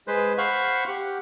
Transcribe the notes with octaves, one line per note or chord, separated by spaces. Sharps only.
G#3 B4 C5
C5 F5 F#5 B5 C#6
G4 F#5